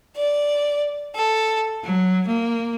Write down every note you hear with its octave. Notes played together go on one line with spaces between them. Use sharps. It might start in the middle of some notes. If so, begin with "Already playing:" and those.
D5
A4
F#3
A#3